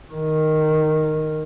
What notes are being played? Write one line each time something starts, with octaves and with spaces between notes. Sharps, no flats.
D#3